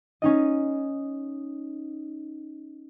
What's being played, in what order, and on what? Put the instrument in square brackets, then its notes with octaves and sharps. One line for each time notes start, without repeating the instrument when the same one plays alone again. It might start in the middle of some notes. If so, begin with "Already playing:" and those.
[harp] C#4 D#4 D#5